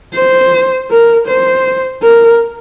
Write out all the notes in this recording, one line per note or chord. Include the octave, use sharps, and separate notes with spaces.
C5
A#4
C5
A#4